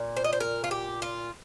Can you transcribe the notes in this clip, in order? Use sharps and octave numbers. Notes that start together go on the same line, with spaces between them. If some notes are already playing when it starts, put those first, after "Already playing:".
Already playing: A#2
C5
D#5
C5
A#4
F4
G4
F4